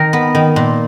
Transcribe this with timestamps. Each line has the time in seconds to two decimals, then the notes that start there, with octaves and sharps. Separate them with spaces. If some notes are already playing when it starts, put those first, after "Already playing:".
Already playing: D#3 A#4
0.13 B3
0.35 D#3
0.56 A#2